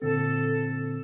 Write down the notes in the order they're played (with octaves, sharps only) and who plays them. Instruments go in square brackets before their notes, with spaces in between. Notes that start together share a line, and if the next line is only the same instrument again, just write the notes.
[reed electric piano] A#2 D3 C4 [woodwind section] A4